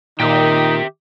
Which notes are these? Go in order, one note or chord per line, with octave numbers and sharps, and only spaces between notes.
A#2 D#3 D#4 G4 E5 G5